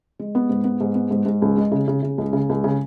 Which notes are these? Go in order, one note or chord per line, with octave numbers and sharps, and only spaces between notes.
G#3
B3
G#2
B3
G#2
B3
G#2
G#2
C#2
G#3
C#3
C#3
C#3
C#2
C#3
C#2
C#3